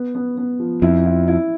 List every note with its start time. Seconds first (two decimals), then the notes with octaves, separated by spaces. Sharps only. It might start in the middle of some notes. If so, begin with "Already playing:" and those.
Already playing: B3
0.15 B3
0.37 B3
0.59 F3
0.82 F2 E4
1.05 E4
1.28 E4